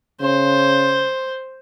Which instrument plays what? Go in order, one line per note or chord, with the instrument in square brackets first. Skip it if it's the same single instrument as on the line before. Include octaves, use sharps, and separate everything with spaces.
[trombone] C#3 [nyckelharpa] C5